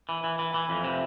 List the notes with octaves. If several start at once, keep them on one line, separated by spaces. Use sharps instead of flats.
E3
E3
E3
E3
F2
C3